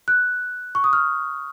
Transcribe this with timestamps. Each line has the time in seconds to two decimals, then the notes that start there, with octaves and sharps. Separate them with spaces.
0.08 F#6
0.75 C#6
0.84 D#6
0.93 F6